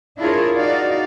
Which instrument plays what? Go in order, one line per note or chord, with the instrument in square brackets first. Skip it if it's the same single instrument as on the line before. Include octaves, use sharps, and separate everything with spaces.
[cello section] D4 E4 F4 G#4 A#4 C#5
D#4 F#4 D5 F5